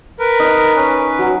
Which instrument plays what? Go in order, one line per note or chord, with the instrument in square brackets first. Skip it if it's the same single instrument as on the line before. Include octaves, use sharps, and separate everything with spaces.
[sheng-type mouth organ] A#4 B4
[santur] D#4
[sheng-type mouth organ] C#4 B4
[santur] F#3